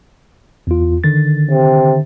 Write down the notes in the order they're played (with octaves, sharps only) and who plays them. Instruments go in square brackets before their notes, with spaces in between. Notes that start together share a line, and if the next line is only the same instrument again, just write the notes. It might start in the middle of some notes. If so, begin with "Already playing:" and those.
[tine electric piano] E2 F4
D3 D#3 A6
[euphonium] C3